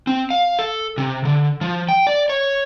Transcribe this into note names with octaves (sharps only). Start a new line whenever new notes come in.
C4
F5
A4
C3
D3
F3
G5
D5
C#5